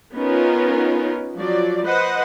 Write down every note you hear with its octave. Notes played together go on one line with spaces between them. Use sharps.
B3 C#4 D#4 F4 A#4
F3 F#3 D5
B4 C5 D#5 F#5